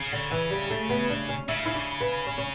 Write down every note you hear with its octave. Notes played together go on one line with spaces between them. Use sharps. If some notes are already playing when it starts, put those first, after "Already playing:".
Already playing: C#3
D3
E3
G3
A3
B3
D4
C#4
C#3 E4
E4
D4
B3
C#4
C#4